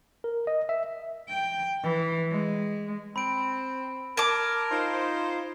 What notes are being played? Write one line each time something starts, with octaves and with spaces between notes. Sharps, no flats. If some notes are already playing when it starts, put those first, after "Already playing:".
A#4
D#5
E5
G5
E3
G#3
C4 B5 D7
A#4 A5 D6 G#6 D7
D#4 F4 C5